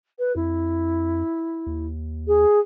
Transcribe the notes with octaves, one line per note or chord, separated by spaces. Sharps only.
B4
F2 E4
D#2
G#4